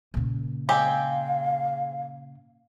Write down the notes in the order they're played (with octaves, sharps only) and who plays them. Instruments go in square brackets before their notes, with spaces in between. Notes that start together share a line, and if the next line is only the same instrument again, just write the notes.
[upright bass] A#2 C#3
[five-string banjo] G#3 C4 G4 [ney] F5